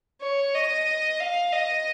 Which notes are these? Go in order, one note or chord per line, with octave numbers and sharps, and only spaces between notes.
C#5
D#5
F5
D#5